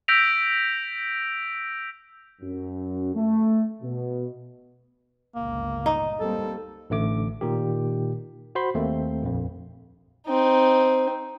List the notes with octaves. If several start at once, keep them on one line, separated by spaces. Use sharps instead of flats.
E6 G6 A#6 B6 D7 F7
F#2
A3
B2
G1 C#2 A#2 A#3
D#4
G3 A#3 C4 A4
A1 D3 A3 D6
A#2 D#3 G4
F#4 C5 B5 C6
D#2 A3 A#3 C4
A#1 F2
C4 D#4